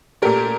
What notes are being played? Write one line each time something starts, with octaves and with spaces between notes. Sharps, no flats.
A#2 A3 G4 A#4